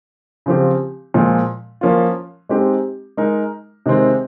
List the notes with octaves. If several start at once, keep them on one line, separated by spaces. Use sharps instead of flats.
C#3 F3 C4 G4
A#2 F3 G#3
F3 A#3 C#4 F4
G#3 C4 D#4 G4
G#3 D#4 A#4
C3 D#3 G#3 C4